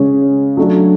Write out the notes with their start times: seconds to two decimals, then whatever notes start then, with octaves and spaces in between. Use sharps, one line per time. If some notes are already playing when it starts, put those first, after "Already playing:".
Already playing: C#3 G#3 C#4
0.57 F#3 A3 D4